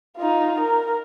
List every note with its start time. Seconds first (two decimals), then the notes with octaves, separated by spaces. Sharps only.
0.17 D#4 F4
0.60 A#4